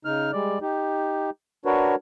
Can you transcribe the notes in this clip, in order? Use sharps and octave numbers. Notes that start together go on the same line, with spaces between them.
C#3 D#4 F6
G3 G#3 D5
D#4 G4
D4 F#4 A#4 B4 C#5